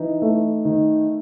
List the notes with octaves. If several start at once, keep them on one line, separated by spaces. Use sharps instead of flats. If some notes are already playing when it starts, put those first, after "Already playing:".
Already playing: E3 D#4
A3
D#3